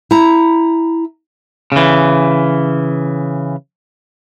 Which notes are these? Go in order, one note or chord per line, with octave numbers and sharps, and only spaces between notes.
E4 A#5
C#3 E3